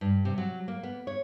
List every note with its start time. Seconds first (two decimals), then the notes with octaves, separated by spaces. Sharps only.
0.01 G2
0.25 C3
0.38 F#3
0.68 A#3
0.83 B3
1.07 C#5